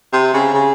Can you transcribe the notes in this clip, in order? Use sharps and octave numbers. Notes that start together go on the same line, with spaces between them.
C3
C#3
C#3